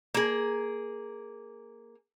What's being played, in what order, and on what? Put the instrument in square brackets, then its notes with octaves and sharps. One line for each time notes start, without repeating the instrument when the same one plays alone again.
[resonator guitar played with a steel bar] A#3 G#4